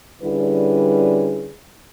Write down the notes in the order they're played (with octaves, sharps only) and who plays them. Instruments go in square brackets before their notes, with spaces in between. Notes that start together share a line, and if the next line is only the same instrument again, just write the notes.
[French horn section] D3 G3 C#4 E4 G#4 B4